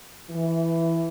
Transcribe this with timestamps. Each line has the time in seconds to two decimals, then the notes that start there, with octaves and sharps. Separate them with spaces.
0.30 E3